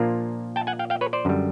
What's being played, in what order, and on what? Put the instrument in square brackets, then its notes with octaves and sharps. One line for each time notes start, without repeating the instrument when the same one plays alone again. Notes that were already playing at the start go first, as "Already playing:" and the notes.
Already playing: [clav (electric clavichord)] A#2 F3 A#3 D4 F4
G5 A5
F#5 G#5
F5 G5
F5 G5
B4 C#5
C5 D5
F#2 D3 G3